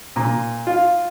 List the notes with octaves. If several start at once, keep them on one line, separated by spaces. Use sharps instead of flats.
A#2
F4